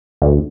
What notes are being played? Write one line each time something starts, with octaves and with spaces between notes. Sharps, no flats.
D2